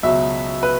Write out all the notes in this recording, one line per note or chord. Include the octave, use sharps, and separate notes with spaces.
C#2 B2 F#3 E5
B4